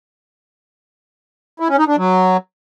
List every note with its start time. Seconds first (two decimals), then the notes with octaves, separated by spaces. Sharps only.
1.60 E4
1.69 C#4
1.79 D#4
1.88 D4
1.97 F#3